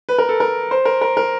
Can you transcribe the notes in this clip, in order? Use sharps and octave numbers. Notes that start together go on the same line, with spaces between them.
B4
A#4
A4
A#4
C5
A#4
A#4
A#4